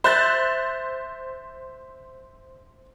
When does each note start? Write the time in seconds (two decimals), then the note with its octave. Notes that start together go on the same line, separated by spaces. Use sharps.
0.04 C5 E5 F#6 G6 A6